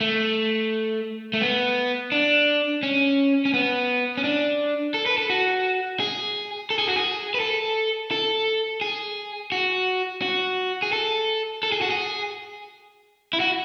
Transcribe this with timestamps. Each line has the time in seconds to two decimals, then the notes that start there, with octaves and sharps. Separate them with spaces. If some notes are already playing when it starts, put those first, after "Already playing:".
0.01 A3
1.33 A3
1.41 B3
2.12 D4
2.83 C#4
3.45 C#4
3.54 B3
4.17 C#4
4.24 D4
4.94 A4
5.06 B4
5.18 A4
5.30 F#4
6.00 G#4
6.70 A4
6.79 G#4
6.87 F#4
6.96 G#4
7.34 B4
7.40 A4
8.11 A4
8.81 G#4
9.52 F#4
10.22 F#4
10.83 G#4
10.93 A4
11.63 A4
11.72 G#4
11.81 F#4
11.91 G#4
13.33 E4
13.40 F#4